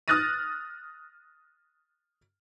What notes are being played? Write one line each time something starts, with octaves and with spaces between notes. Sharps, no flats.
D#6 F6 F#6 A6 A#6 D#7